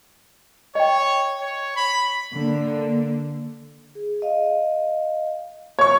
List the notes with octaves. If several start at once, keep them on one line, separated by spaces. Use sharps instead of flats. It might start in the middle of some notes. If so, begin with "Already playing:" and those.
C#5 D#5 G5
C#5
B5
D3 A#3
G#4
D#5 F5
C#5 C#6